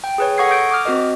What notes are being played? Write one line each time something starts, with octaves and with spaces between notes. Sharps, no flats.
G5
G#4 B4 C#5
A4 F#5 C#6 D#6 G#6 C7
D#6 G6 A#6 D7
D6 D#6 F6
C4 F#4 A#4 D#5